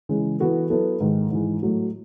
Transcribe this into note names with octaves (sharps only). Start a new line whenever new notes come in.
C#3 E3 G#3
E3 B3 F#4 A4
F#3 B3 E4 A4
G#2 D#3 G#3
G#2 E3 G#3
A2 F#3 A3